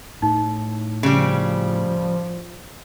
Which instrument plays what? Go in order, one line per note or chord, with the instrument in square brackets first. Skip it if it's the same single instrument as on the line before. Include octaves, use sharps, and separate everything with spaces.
[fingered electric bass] A2 [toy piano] D#4
[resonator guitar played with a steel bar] C#3 G3 [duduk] F3